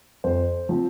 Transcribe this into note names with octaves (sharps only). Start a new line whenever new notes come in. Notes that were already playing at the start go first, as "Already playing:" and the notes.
F2 C5
F3 C4